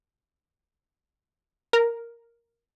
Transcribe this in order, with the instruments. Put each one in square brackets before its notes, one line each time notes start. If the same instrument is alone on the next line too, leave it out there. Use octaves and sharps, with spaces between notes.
[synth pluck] A#4